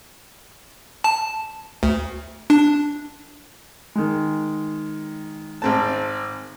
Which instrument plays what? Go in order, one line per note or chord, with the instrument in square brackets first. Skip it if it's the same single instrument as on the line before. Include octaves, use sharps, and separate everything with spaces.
[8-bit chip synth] A5
D2
D4
[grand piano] D#3 G#3
[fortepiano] G#1 C4 A5